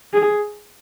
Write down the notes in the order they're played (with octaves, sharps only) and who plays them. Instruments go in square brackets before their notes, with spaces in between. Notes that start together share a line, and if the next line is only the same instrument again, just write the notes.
[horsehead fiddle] G#4